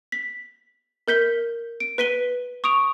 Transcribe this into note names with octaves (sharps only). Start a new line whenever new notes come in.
B6
A#4 G6 B6 G7
D7
B4 B6 D#7 G7
C#6 D#6 D7 F7